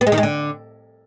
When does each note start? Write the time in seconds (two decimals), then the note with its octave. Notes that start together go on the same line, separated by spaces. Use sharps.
0.01 B3
0.07 G#3
0.12 D#3
0.18 G#3
0.23 D3